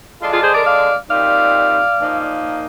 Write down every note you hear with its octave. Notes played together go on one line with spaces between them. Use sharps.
D3 G#3 D4 F4
F4 G#4
G#4 C5
A#4 D5
D5 F5
A#2 G3 C4 D#4 D5 F5
A#2 F3 A#3 D#4